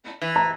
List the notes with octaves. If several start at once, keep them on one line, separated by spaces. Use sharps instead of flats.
E3
A#5